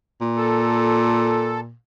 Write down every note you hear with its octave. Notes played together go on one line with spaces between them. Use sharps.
A#2
A4